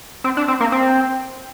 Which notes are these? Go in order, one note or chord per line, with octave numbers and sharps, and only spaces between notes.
C4
D4
C4
A#3
C4